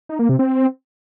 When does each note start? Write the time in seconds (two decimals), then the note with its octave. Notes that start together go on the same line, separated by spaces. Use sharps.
0.09 D#4
0.19 A#3
0.29 C3
0.39 C4